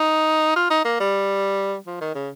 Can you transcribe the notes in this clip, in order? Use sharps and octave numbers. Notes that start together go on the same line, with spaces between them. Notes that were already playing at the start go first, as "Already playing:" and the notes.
Already playing: D#4
F4
D#4
A#3
G3
F3
D#3
C#3